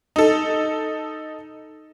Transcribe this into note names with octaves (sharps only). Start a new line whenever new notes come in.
D#4 A4